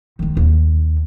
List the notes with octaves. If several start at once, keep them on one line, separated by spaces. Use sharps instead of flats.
D#3 G#3
D#2